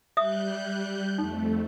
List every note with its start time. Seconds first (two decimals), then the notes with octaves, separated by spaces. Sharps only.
0.17 G3 E5 D#6 F#6 G6
1.18 F2 A3 D#4